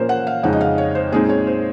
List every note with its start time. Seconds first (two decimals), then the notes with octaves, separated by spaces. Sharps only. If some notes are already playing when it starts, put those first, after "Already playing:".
Already playing: A#2 F3 A#3 C#4 A#4 C5
0.09 F#5
0.27 F5
0.43 F2 C#3 G#3 D#4 F#5
0.53 D#5
0.61 F5
0.78 C#5
0.95 C5
1.12 A#2 G#3 C4 D#4 G#4
1.29 C#5
1.47 C5